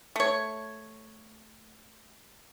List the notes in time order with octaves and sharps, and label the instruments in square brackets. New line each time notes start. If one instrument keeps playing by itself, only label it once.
[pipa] A3 C#5